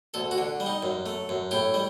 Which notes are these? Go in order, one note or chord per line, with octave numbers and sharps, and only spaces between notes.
D2 A4
F#4
D3
G3
D#4
F#2
A3
F#2
A2 G4
G3